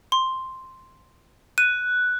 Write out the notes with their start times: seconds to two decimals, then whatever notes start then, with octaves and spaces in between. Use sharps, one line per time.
0.12 C6
1.58 F#6 D#7